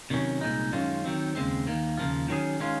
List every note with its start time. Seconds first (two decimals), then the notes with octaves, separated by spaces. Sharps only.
0.10 C3 D#3 F#3 C#4
0.41 C2 A#2 G#3 D#4
0.73 F#2 D#3 G#3 C#4 F4
1.04 D#3 F#3 C4
1.35 D#2 C#3 G#3 C4
1.67 D#2 D#3 A#3
1.98 D#2 C#3 F3 A#3 F4
2.28 D#3 F#3 C#4 G#4
2.60 D#3 G#3 C#4 F4